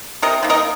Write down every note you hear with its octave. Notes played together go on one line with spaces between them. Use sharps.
C3 A#4 D#5
D#3 A#3
A#4 D#5